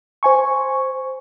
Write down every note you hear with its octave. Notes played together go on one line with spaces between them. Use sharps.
C5 G#5 C#6